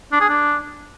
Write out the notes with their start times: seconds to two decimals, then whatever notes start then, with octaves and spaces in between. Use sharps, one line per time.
0.12 D4
0.21 G#4
0.29 D4